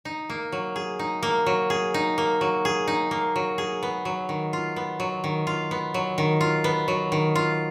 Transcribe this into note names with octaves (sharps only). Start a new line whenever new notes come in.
D#4
A#3
F#3
G#4
D#4
A#3
F#3
G#4
D#4
A#3
F#3
G#4
D#4
A#3
F#3
G#4
B3
F#3
D#3
F4
B3
F#3
D#3
F4
B3
F#3
D#3
F4
B3
F#3
D#3
F4